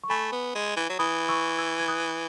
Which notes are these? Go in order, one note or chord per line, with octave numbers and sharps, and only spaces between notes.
C#6
A3 G#5 B5
B3
G#3
E3
F#3
E3 B5 D#6
C#6 E6
E6 G#6
G#6
D#6 F#6